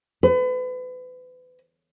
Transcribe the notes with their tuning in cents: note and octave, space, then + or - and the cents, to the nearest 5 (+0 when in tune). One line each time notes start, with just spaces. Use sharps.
B4 +35